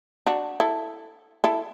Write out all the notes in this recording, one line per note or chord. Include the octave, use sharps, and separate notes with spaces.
D4 F#4
E4 A4
E4 A4